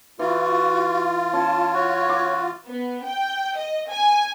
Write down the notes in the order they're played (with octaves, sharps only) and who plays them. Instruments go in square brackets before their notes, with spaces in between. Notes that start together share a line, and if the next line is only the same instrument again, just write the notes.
[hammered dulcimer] E3 [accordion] F4 [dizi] F#4
[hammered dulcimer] C#4 [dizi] A5
[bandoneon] F#4 [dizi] C#5
[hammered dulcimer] D6
[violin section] B3
G5
D#5
G#5